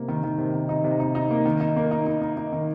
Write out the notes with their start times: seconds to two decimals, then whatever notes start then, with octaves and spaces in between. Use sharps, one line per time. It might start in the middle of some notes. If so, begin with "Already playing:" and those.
Already playing: C3 A#3 D#4
0.08 D#3
0.24 D#3
0.38 C3
0.54 D#3
0.69 D#4
0.84 C3
1.00 D#4
1.15 D#4
1.31 A#3
1.45 D#3
1.61 D#4
1.76 A#3
1.91 D#4
2.07 D#4
2.22 D#4
2.37 D#4
2.52 D#3